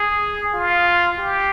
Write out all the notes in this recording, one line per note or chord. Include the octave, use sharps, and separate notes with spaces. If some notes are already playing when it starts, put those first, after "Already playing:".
Already playing: G#4
F4
G4